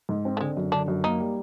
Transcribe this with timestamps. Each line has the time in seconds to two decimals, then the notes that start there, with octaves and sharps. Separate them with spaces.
0.09 G#2
0.25 C4
0.37 A3
0.40 D3 G#3
0.57 F#2
0.72 D3 D4
0.88 F#2
1.04 A#3 D#4
1.20 G3